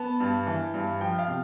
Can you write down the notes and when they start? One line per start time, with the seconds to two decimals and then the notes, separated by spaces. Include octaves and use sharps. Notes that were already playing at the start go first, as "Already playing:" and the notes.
Already playing: B3 A5
0.20 G2
0.47 E3
0.74 G2
1.00 F3 G5
1.19 F5
1.27 C3